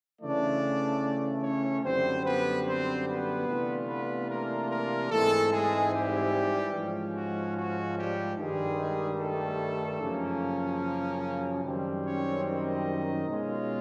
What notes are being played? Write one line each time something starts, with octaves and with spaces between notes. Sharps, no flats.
C#3 E3 A3 D4 D5
C#4 C#5
F#2 D3 G3 C4 C5
B3 B4
C4 C5
B3 B4
C3 E3 A3 D4 F4
B3 B4
A#3 A#4
A#3 A#4
G#2 E3 G#3 A3 C4 A4
G#3 G#4
G3 G4
G#2 F3 G#3 C#4
F#4
F#4
G3 G4
G2 D#3 G3 G#3 G#4
A3 A4
F#2 C#3 F3 A#3 C#4
F#2 D#3 G3 C4
C#4 C#5
D#4 D#5
B2 G#3 C#4 F4